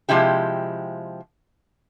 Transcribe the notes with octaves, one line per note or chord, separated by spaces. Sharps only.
C3 F3 G#3 E4 G4